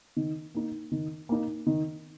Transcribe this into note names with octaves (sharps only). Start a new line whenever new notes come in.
D#3
A#3 D#4
D#3
A#3 D#4
D#3